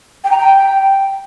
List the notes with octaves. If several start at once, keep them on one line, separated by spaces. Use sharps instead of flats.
G5
A#5
G5